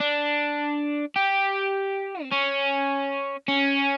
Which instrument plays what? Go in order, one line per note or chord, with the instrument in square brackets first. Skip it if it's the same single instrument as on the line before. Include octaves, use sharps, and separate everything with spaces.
[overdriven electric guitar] D4
G4
C4
C#4
C#4